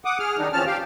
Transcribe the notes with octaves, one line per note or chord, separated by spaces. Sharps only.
F#5 D6 D#6
G#4 F6
D#3 G3 D4 D#4
E2 F3 C4 C#4 A5 F6
G4 F5 G5